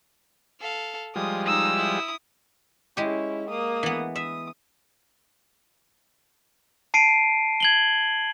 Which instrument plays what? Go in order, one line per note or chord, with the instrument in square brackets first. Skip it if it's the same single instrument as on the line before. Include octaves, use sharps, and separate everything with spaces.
[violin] A4 F5
[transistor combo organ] F3 G3 G#3 [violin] D#6
[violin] D#4 D#6 [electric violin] E6
[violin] E4 D#6
[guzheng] G#3 G4 [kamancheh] C#4 E4
[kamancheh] A#3 D#6
[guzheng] E3 B3
[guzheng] E5 [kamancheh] D#6
[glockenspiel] A5 C7 D7 D#7
G#6 F#7 G7